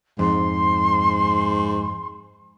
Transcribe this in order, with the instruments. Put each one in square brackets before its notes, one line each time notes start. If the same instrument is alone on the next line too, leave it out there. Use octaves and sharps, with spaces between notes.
[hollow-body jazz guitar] F2 [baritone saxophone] G#2 [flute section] C6